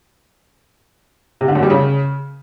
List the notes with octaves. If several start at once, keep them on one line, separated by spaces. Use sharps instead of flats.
C3
D3
F#2
G3
C#3